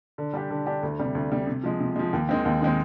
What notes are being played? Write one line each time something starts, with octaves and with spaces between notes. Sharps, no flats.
D3
G3 D4 G4
D3
G3 D4 G4
D2
C3 G3
D2
C3 G3
C3
F3 G#3
C3
F3 G#3
D#2
D#3 G#3 C4
D#2
D#3 G#3 C4